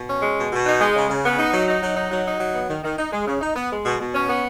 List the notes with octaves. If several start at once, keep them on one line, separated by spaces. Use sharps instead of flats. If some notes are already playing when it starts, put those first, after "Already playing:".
Already playing: B2
C#4
G#3
B2
B2
D#4
G#3
C#3
C#3
B3
D#4
F#3
D#4
F#3
D#4
F#3
D#4
F#3
B3
D#3
D#3
D#4
G#3
C#3
D#4
B3
G#3
B2
B2
C#4
B3